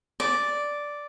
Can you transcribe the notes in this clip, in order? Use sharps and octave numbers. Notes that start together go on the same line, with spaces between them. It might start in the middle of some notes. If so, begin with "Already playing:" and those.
D5